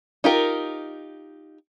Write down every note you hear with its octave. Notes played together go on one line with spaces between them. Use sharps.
D#4 F4 G4 A#4